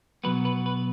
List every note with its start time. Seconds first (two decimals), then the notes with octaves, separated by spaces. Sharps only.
0.24 B2 F#3 B3 B4
0.45 B4
0.66 B4